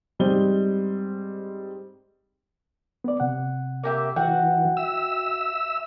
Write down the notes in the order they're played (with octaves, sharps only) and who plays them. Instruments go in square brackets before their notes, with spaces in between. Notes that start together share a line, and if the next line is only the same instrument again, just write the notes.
[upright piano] G#2 G3 C4 D#5 G7
[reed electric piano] B3 D5
C3 F#5
[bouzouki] A#3 G4 E5
[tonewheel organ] E3 [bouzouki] F#4 F#5 [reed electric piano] G5
[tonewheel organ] E5 E6